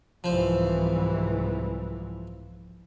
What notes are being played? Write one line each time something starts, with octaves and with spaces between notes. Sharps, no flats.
C2 G#2 E3 F3 C5